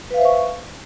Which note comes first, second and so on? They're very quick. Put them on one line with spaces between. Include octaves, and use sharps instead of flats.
B4 F5 E5 C5 C#6